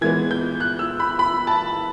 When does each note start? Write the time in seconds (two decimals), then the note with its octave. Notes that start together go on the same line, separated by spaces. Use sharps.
0.01 E3 G#3 B3 G#6
0.31 G6
0.60 F#6
0.79 E6
1.00 B5
1.19 B5
1.47 A5